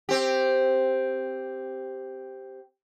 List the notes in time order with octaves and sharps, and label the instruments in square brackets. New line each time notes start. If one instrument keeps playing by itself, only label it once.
[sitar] C4 G4